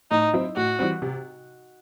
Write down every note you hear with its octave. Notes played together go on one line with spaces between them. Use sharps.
A2 D#4
F#3 C4 E4
A2 F#4
E3 G3 C4
C3